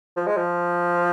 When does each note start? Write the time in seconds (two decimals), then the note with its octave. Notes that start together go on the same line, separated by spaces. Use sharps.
0.16 F3
0.27 G#3
0.37 F3